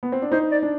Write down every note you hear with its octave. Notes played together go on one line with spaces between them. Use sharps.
B3
C4
D4
D#4 C5
D5
D4